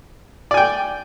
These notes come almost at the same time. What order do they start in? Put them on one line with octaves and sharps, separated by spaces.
D5 G#5 G5